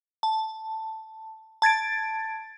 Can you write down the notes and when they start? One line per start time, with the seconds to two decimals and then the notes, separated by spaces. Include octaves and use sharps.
0.23 A5
1.62 A5 G#6 A6 D7